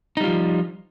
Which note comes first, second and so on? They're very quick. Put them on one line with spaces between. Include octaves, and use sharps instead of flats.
D#4 G3 F4 F3